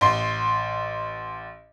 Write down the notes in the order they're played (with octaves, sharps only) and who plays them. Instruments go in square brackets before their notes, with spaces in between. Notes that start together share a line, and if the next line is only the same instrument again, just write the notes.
[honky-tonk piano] A1 C6